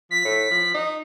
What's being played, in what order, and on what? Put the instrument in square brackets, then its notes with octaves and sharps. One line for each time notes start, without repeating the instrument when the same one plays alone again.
[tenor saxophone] F3 [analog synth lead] B6
[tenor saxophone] A2
F3
D#4